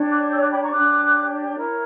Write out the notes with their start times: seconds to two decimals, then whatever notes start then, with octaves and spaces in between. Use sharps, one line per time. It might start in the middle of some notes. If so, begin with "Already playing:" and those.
Already playing: D4 G4 C#5
0.10 D6 F#6
0.31 E6 G6
0.41 D6 F#6
0.52 G5 B5
0.62 A#5 C#6
0.73 D4 G4 C#5 D6 F#6
1.56 E4 A#4 C#5